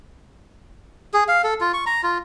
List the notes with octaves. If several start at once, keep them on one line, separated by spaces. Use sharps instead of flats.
G#4
F5
A4
F4
C#6
A#5
F4